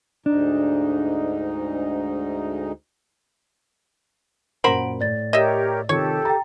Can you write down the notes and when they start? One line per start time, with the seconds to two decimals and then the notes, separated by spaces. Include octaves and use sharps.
0.26 D2 G#2 D4 D#4
4.64 F#2 A#2 A#4 C5 F#5 B5 D7
5.01 A2 D5 A6
5.33 G4 A#4 C#5 D#5 E5
5.89 C3 D#3 F4 G4 A4 C#5
6.25 G5 A#5 A6